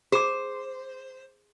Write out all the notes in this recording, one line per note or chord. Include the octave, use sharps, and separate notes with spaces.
G#4 C5 D6